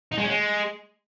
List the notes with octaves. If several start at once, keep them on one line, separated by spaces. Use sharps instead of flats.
D#4
G#3
C#4
G#3